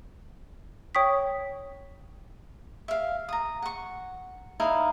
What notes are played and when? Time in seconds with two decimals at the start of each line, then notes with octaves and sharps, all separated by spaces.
0.95 C#5 G5 C#6 D#6 B6
2.88 E5 F5
3.29 A#5 D#6
3.62 F#5 C#6
4.60 D#4 E4 A#4 F5